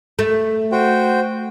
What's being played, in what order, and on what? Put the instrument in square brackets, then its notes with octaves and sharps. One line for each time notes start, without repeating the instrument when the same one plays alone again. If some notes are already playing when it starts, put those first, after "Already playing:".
[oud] A3
[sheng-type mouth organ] F#4 C5 G5